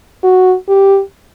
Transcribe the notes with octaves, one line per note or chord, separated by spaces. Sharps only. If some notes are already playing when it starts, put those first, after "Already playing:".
F#4
G4